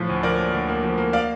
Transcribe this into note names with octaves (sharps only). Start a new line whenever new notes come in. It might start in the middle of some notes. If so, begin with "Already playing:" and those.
Already playing: A2 F3
D2
F3 A#4 D5
A#3
D2
A#3
F3
A#3
D5 F5